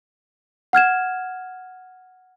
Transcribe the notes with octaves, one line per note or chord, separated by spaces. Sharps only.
F#5 F6 G#6 E7